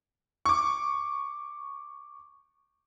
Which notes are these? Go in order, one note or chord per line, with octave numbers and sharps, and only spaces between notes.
C#6 D6